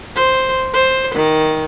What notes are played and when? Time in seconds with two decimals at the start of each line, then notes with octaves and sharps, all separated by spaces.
0.16 C5
0.74 C5
1.15 D#3